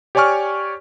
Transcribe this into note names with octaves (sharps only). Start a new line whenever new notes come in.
G4 C#5 D5 G#5 C#6 F6